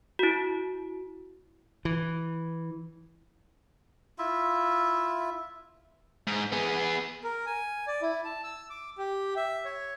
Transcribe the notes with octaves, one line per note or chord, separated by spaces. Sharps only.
E4 F#4
E3
E4 F4 E5
G#2
B3 G#4
A#4
G#5
D5
E4
A5
E6
D6
G4
E5
C#5